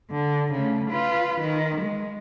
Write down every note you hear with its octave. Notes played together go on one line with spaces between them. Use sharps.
D3
C#3 A3
F4 B4
D#3
G#3